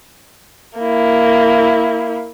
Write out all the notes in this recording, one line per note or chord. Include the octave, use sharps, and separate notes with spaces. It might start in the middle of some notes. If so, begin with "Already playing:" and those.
A#3 E4